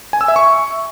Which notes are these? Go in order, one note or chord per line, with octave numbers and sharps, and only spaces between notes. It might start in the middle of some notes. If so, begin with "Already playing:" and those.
G#5
E6
E5
C#6